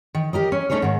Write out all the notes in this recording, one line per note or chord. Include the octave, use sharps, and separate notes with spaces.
D#3
G4 A#4 D#5
C#4
A3 C#4 D#4 G#4 C#5
G#2 D#3